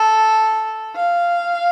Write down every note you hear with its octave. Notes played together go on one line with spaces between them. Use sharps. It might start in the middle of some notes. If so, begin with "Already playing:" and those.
Already playing: A4
F5